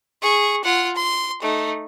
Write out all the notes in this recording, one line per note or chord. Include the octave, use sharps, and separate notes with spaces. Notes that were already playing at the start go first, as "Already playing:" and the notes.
G#4 C#6
F4 F#5
C6
A3 D#4